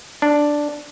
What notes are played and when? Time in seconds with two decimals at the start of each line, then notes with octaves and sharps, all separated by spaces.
0.22 D4